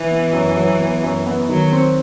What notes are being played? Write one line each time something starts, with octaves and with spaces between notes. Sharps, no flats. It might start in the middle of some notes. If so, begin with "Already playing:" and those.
Already playing: E3
B3
F#2
F#3
B3
F#2
B3
D#3 F#3
C4